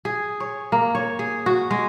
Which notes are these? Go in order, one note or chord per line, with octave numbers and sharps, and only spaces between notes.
G#4
C#5
A#3
C#5
G#4
F#4
G#3